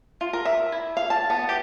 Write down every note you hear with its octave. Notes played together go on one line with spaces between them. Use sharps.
F4
A#4
E5
E4
F5
A5
B3
G4